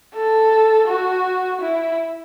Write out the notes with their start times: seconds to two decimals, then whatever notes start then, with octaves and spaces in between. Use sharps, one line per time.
0.14 A4
0.87 F#4
1.61 E4